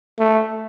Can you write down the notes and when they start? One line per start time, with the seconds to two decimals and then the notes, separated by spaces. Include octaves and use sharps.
0.19 A3